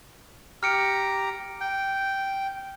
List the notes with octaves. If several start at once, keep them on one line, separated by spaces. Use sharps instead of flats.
G4 A#5 F6 C#7 D7
G5